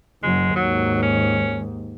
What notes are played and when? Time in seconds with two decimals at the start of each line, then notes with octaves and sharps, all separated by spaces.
0.23 F#1 F#3 G#3
0.56 D#2 G#2 F#3
1.02 C#4